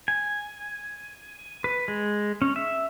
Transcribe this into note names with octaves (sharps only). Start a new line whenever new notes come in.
G#5
B4
G#3
C#4
E5